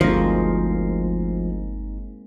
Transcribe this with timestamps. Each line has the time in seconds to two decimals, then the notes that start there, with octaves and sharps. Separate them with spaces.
0.01 G1 D2 F3 G#3 A#3 C4 D#4 A#6